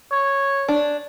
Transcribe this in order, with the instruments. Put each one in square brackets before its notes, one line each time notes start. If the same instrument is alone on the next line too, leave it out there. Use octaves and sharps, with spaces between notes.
[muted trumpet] C#5
[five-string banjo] D4